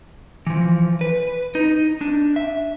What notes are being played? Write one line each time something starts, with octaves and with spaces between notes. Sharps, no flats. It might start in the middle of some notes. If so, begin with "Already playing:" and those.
E3 F3
B4
D#4
D4
E5